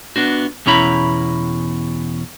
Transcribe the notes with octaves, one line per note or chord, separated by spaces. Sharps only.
B3 D4 F#4
E2 B2 C#4 E4 A#5 B5